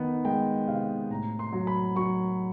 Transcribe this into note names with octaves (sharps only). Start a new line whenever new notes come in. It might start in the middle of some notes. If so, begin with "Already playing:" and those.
Already playing: D#3 B3
G#3 G5
C3 F5
A2 A#5
C6
F#3
B5
F#3 C#6